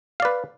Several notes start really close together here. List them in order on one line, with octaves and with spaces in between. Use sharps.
F5 D5 B4